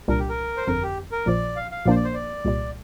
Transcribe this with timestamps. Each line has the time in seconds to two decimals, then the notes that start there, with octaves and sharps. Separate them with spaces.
0.08 C2 A#2 G3 D4 A#4
0.19 G4
0.29 A#4
0.57 C5
0.67 G1 F2 D3 A#4
0.83 G4
1.12 A#4
1.26 A#1 A#2 F3 D5
1.56 F5
1.71 F5
1.85 A#1 A#2 F3 A#3 D4 C5 D5
1.96 D5
2.05 C5
2.14 D5
2.45 C2 A#2 G3